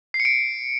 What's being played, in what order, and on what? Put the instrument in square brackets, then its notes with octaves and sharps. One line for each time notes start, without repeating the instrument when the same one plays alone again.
[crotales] C7
C#7
D7